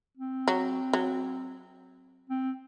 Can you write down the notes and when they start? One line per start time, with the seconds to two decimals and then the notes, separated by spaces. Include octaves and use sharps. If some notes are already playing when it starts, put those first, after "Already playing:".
0.17 C4
0.48 F#3
0.93 F#3
2.30 C4